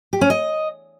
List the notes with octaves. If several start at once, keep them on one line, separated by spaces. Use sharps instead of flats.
G4
C#4
D#5